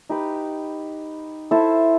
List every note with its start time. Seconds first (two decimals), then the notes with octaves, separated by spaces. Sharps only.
0.09 D#4 G4 B4
1.51 E4 A4 C5